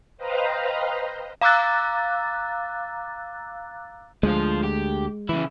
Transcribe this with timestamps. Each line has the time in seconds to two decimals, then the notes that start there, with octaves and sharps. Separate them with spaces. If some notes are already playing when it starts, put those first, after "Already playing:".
0.17 B4 C5 D#5 F5 G5 A#5
1.41 F5 A#5 D6 E6 F#6 A6
4.23 D2 F3 G#3 F4
4.63 G4
5.29 C#3 E3 E4